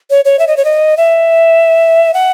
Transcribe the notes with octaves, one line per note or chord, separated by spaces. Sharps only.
C#5
C#5
E5
D#5
C#5
D#5
E5
F#5